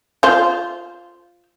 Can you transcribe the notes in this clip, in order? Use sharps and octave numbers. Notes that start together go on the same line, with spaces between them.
F4 C5